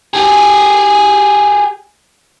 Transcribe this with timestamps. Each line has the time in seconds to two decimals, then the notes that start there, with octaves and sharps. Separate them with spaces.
0.14 G4 G#4